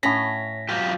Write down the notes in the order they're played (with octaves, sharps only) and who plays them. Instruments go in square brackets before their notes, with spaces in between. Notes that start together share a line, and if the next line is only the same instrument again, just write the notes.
[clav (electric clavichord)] A2 F5 [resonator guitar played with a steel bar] C#4 [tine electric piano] A#6 B6
[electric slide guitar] F#3 F4 G4